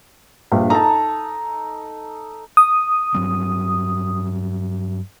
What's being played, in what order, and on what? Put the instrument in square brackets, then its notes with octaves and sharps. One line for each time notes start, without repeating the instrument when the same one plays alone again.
[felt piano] A#1 G2
[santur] D#4 A4 [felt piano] A5 A#5
[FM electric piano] D#6
[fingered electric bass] G2 F#3 C4